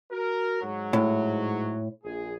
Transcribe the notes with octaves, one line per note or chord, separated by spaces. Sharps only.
F#4 A#4
G#2 F#3
A2
A#1 G#4